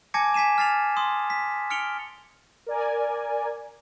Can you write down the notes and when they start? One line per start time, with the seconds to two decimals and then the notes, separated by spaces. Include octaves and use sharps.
0.14 G#5 A5 D6 G#6 A#6 C#7
0.34 G#5 B6 C7 D#7 E7
0.58 F6 A6 C7 F7
0.97 C6 D#6
1.30 B6
1.70 F6 C#7 D7 F7 G7
2.66 A#4 D5 G#5